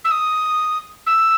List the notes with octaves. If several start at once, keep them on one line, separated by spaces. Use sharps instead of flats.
E6
D#6
E6